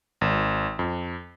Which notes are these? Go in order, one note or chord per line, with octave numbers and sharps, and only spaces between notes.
G#1
F2